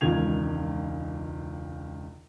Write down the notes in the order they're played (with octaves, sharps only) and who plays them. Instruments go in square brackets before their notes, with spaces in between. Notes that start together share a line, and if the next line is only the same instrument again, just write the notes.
[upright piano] E1 C#2 D#3 G#6 F7